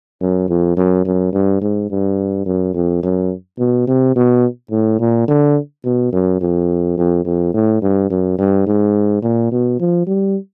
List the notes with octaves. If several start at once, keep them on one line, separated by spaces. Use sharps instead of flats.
F#2
F2
F#2
F#2
G2
G#2
G2
F#2
F2
F#2
B2
C3
B2
A2
A#2
D3
B2
F#2
F2
F2
F2
A2
G2
F#2
G2
G#2
A#2
B2
F3
G3